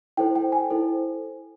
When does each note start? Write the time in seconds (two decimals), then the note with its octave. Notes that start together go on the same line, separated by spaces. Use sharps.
0.17 E4 A4 C5 G5
0.35 G5
0.52 G#5
0.70 E4 A4 C5